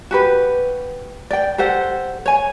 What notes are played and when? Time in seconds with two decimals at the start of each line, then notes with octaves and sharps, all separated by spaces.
0.11 F#4 G4 B4
1.31 D5 G5
1.58 G4 A4 C5 F#5
2.26 C#5 G#5